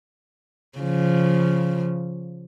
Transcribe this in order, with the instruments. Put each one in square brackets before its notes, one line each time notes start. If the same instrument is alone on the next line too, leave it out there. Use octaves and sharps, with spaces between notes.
[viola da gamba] C#3 F3